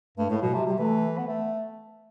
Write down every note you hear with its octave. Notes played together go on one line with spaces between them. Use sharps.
G2 A3
A2 A3
B2 F#3
C3 F#3
C3 G3
E3 A3
B3
A3